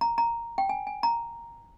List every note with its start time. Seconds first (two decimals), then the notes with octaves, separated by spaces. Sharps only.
0.01 A#5
0.18 A#5
0.58 G5
0.69 G#5
0.87 G#5
1.03 A#5